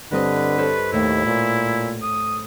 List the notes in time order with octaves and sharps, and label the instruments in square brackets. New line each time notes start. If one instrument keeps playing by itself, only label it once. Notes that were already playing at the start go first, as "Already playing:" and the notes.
[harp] G2 C4 D#5 [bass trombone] D3 [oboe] B4
[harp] A4 C5 C#5
[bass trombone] D#2 [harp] A2 [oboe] E4
[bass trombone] A#2
[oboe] D#6